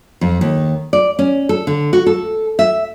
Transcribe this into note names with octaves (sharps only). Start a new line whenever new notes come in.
F2
D#2
D5
C#4
A4
D3
F#4
A4
E5